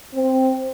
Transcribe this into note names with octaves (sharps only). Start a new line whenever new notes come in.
C4